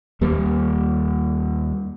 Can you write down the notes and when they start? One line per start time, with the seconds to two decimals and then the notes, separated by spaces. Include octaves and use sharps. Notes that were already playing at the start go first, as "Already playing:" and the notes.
0.21 D#2 G3 A#3